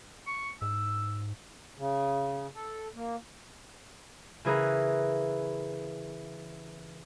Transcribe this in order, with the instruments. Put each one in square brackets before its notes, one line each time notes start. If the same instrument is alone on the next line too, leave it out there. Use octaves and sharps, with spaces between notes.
[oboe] C#6
[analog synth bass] G#2 [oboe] E6
[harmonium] C#3
A4
A#3
[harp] C#3 E3 G#4 A#4 B4